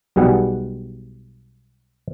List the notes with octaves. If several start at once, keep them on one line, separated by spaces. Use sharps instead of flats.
B1 B2 G3 G#4 F#5